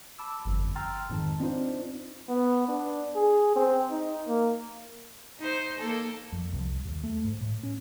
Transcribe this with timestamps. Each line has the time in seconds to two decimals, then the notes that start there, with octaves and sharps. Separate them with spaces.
0.18 A5 B5 D6 E6
0.45 G1 F2
0.75 G5 A#5 C6 E6 F6 A6
1.09 F2 G#2 D#3 A5
1.40 C4 D4 D#4 F4 C5
2.29 B3
2.68 D4
3.16 G#4
3.56 C4
3.90 D#4
4.28 A#3
5.39 D#4 C5
5.80 A#3 A4
6.33 F2
6.52 C2
6.85 D#2
7.04 A3
7.25 G#2
7.41 A2
7.63 C#4